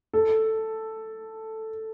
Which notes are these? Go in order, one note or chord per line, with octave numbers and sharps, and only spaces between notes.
A4